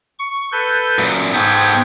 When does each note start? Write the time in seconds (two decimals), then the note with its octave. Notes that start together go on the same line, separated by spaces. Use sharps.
0.19 C#6
0.52 A4 B4 G6
0.99 F#2 A#2
1.33 G#2 B3 A4 G5 G#6